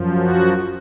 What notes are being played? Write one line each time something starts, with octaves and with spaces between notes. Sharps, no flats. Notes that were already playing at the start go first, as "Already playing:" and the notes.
Already playing: F#2 F3
F#4